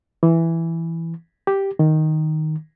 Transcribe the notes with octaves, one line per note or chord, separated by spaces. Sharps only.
E3
G4
D#3